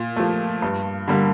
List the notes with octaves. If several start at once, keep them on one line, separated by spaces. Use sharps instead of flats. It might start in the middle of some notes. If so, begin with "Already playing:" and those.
Already playing: A#2
F3 A3
G2
D3 G3 A#3